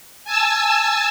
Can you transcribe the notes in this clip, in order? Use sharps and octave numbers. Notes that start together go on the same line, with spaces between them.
G#5 A5 E6